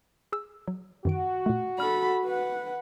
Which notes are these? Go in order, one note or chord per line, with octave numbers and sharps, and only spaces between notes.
G#4 E6
F#3
F#2 D#3 F#4 D7
A#2 A3
A4 D5 B5 F6
B4 F#5